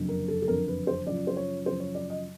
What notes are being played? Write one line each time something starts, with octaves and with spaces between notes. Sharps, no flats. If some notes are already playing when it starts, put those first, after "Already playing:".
Already playing: F#1 F2 D3
A#4
A4
A4
F#1 F2 D3 A#4
B4
C5
F#2 C#3 F3 D5
C5
C#5
F#2 C#3 F3 C5
C#5
D5
D#5